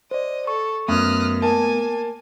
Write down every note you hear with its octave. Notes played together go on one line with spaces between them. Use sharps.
C5 D5 D#5
A4 C#6
F#2 A3 B3 D#6 F6 F#6
A#3 G#5 A5